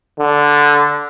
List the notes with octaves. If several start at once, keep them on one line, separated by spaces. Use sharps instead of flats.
D3